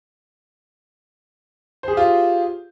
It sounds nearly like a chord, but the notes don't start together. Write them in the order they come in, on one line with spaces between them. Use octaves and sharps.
C5 G#4 G4 F4